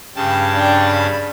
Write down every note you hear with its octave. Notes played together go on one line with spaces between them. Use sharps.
G2 C#3 G5 A5
D4 G5
B5